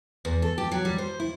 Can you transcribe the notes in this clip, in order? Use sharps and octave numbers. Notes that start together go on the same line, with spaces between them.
E2
A4
G4
F#3
G3
C5
E4